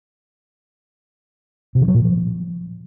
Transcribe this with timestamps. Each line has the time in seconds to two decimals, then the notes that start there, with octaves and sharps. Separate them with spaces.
1.75 C3
1.82 D#3
1.88 F#3
1.94 A#2
2.01 F3